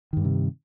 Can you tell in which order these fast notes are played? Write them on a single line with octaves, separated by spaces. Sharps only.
D#3 G2 G3 C3